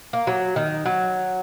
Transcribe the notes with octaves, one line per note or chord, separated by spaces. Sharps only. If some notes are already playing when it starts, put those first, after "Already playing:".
A#3
F#3
D#3
F#3